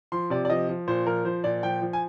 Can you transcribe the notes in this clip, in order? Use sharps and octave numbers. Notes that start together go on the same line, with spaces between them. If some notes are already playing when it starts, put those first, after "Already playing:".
F3 C6
C3 D5
D5
F3 D#5
F3
A#2 C5
F3 A#4
F3 C5
A#2 D5
F3 G5
F3
G#5